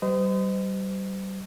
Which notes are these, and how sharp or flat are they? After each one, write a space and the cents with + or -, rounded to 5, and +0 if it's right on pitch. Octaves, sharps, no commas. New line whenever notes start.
G3 -30 C5 -40 D#5 +0